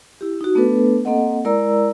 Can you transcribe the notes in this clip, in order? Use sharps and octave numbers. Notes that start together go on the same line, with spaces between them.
E4 G4
D#4 F#4
A3 B3 D4 A4 B4
A#3 C4 A4 D#5 F#5
G#3 E4 A#4 D5 A#5 E6